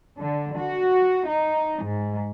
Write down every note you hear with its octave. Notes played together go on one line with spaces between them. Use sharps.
D3
F#4
D#4
G#2